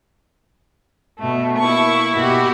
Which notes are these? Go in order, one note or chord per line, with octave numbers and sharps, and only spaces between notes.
B2 A3
A#3 E4 C#6
B2 F#4 G4